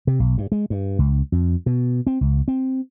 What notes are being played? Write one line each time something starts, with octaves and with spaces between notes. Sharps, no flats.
C3
B1
G2
G#3
G2
C#2
F2
B2
C4
C#2
C4